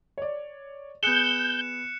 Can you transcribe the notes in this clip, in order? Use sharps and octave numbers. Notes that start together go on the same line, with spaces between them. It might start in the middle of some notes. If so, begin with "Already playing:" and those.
C#5 D5
B3 G#4 F#6 G6 C#7 E7